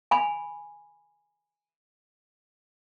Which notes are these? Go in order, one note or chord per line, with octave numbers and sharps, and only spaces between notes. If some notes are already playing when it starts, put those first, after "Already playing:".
G#5 B5